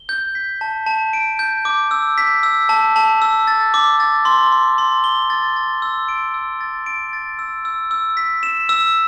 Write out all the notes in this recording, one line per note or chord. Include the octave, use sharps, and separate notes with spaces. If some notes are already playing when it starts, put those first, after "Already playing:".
Already playing: G7
G6
B6
A5
A5
D7
G6
D6
E6
B6
E6
A5
A5
E6
A6
D6
A6
C6
C6
C6
G7
A6
A6
E6
D7
E6
A6
D7
A6
E6
E6
E6
B6
E7
E6